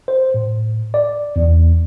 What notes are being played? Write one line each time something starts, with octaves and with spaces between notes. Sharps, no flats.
C5
A2
D5
E2